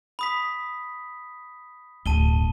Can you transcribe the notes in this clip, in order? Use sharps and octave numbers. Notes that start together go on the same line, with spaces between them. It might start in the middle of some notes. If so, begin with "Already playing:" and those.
B5 D#6 B6
D1 G2 A5 D#7 G7